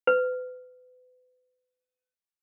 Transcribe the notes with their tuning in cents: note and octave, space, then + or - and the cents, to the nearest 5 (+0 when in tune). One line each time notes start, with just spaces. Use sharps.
B4 +35